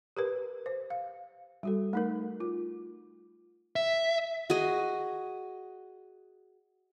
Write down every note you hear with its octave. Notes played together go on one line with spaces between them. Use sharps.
G4 A#4 B4
C5
F5
G3 F#4 A4
A3 D#4 A#4
F4
E5
F#4 G#4 D#5